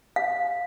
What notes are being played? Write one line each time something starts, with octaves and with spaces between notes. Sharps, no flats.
F5